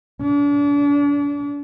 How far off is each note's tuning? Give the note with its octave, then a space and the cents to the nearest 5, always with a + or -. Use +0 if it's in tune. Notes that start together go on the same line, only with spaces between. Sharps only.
D4 -35